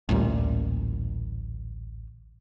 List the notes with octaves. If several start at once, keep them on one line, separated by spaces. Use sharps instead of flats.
A1 D2 A#2 G3